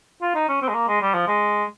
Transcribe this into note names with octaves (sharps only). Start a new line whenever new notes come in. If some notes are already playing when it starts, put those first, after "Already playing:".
F4
D#4
C#4
C4
G#3
A#3
G#3
G3
F3
G#3